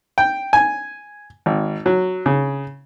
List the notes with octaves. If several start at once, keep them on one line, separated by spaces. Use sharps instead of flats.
G5
G#5
G#1
F#3
C#3